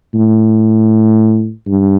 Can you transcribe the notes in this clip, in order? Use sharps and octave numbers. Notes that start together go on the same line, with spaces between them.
A2
G2